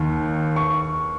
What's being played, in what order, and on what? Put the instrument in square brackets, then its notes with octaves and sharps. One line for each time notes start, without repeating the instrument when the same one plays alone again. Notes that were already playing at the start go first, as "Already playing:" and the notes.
Already playing: [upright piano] D#2 D#3
C#6